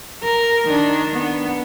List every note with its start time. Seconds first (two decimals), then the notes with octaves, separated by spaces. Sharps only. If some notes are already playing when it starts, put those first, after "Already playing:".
0.24 A#4
0.65 D#3 D4
1.13 B3